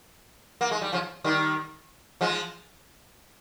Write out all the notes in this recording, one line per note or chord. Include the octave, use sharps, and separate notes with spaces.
A#3
G#3
G3
C#3 F3
D#3 G3
F3 G#3